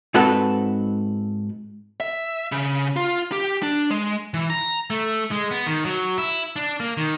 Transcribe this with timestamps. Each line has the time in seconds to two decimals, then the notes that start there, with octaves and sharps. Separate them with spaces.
0.14 G#2 C4 F#4 A4 B4
2.00 E5
2.52 C#3
2.96 F4
3.32 G4
3.63 D4
3.91 G#3
4.34 E3
4.50 A#5
4.90 A3
5.31 G#3
5.51 B3
5.67 D#3
5.85 F#3
6.18 E4
6.56 D4
6.80 A#3
6.97 D#3